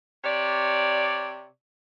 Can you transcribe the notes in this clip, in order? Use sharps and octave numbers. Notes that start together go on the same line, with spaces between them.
C3 C#5 D5